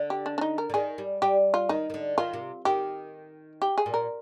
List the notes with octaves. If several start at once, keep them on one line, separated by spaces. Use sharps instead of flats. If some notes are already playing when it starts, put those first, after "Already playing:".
Already playing: D3
G4
D4
D4
D#4
A#4
D3
D#3 G#4
G3
G3 G4
F4
D#3 D#4
D#3
D3
D#3 F4
C3
D#3 G4
G4
G#4
A#2
A#4